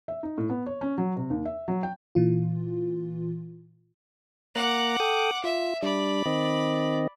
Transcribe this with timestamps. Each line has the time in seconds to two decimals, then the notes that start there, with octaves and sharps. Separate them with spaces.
0.08 E5
0.23 D#4
0.38 A2
0.50 B3
0.66 C#5
0.81 C#4
0.98 F#3
1.16 C3
1.30 D#2
1.45 E5
1.68 F#3
1.83 G5
2.15 A#2 E3 F4
4.56 A#3 F#5 A#5 D6 F#6
5.00 A4 G5 D#6
5.44 F4 E5
5.83 G3 D4 D5 B5
6.26 D#3 C4 D#5